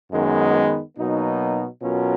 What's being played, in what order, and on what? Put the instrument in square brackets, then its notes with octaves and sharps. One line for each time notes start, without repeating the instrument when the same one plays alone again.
[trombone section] F#2 D#3 G#3 B3
B2 F#3 A#3 D#4
B2 F#3 C#4 F4 A#4